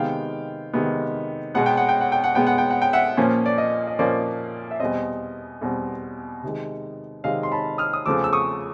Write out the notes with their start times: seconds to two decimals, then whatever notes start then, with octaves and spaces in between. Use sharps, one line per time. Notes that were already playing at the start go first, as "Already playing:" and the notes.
Already playing: C3 D#3 G#3 B3 F5 G5
0.73 C3 D#3 G#3 B3
1.54 B2 G#3 B3 F#5
1.66 G5
1.77 F#5
1.89 G5
2.01 F#5
2.12 G5
2.24 F#5
2.35 B2 G#3 B3 G5
2.47 F#5
2.58 G5
2.70 F#5
2.82 G5
2.93 E5 F#5
3.17 A#2 F3 A#3 C#4
3.46 D5
3.58 D#5
3.87 D#5
3.99 A#2 F3 A#3 C#4 D5
4.71 E5
4.80 E2 B2 G3 C4 D#5
5.61 E2 B2 G3 C4
6.43 C3 D#3 G#3
7.24 C3 D#3 G#3 D#5 F5
7.43 C6
7.52 A5 B5
7.78 D#6 F6
7.93 D#6
8.06 E2 C#3 F3 A3 D6 E6
8.24 E6
8.33 C#6 D#6